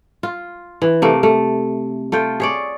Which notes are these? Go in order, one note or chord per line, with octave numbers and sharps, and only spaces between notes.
F4
E3
C3 A3 A#3
A3
A3 F4 G5
G#4 C#5 D5